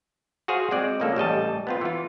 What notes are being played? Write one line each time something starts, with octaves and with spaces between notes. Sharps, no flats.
F#4 G#4 C5 F5
G#3 C4 D5
C#3 F3 A#3 C#4 A4
A1 G3 D#5 A5
B3 C4 F4
E3 F4